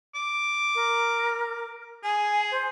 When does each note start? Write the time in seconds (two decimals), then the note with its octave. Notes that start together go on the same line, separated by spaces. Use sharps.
0.15 D6
0.75 A#4
2.04 G#4 G#5
2.51 C5